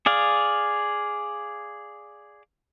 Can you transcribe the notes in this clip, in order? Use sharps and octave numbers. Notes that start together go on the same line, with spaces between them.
G#4 D5 F5